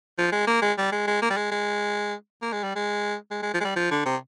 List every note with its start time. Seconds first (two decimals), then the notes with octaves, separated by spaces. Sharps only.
0.18 F3
0.32 G#3
0.47 A#3
0.62 G#3
0.78 G3
0.92 G#3
1.07 G#3
1.22 A#3
1.30 G3
1.37 G#3
1.51 G#3
2.42 A#3
2.53 G#3
2.63 G3
2.76 G#3
3.31 G#3
3.42 G#3
3.54 F3
3.60 G#3
3.64 G3
3.76 F3
3.91 D3
4.06 C3